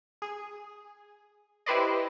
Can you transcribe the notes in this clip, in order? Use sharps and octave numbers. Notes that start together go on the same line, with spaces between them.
G#4
E4 G4 B4 C5 D5 D#5